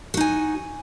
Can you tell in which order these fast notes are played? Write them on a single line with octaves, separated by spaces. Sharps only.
F#4 D#4 G#5